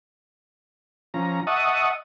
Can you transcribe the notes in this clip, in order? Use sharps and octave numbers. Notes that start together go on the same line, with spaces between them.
F3 C#4 A#5
D#5 E5 F#5 A5 C#6 D#6